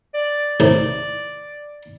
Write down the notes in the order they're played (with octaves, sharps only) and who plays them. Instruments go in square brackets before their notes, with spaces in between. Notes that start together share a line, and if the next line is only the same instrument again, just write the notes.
[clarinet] D5
[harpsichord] A2 C3 D#3